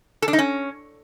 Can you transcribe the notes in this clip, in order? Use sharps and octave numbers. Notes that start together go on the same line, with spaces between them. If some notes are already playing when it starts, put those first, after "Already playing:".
A4
D4
D#4
C#4